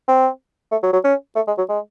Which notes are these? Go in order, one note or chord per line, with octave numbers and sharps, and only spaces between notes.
C4
A3
F#3
F#3
C#4
A3
G#3
F#3
G#3